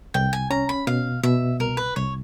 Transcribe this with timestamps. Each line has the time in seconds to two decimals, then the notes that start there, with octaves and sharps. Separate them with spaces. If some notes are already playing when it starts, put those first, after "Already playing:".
0.14 C2 G5
0.33 G#5
0.51 C#4 A#5
0.69 B5
0.87 B2 F5
1.23 B2 E5
1.59 C2 A#4
1.77 B4
1.96 C2 C#5